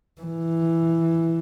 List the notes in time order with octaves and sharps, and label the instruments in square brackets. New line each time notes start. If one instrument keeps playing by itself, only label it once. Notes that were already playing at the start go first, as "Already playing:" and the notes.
[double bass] E3